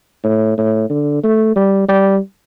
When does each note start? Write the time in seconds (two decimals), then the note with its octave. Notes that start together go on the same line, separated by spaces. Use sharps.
0.24 A2
0.58 A2
0.90 D3
1.23 A3
1.56 G3
1.89 G3